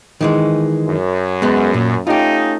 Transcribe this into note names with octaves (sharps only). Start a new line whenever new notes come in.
D#3 E3 G#3
F#2
G#3 B3
A#2
A3 C#4 D#4 F4 G4